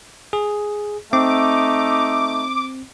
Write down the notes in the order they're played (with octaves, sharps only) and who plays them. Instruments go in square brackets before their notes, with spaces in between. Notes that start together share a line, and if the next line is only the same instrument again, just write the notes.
[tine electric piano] G#4
[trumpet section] A3 D#4 E5 [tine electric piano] C4 [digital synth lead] D6